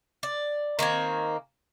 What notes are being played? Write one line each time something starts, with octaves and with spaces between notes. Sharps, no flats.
D5
D#3 A#3 C4 G#5